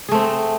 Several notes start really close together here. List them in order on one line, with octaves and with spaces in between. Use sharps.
G#4 A3 C4